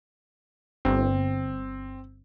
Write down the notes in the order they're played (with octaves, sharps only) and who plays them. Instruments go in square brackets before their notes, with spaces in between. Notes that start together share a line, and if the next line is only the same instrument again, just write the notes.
[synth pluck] G1 [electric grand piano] C4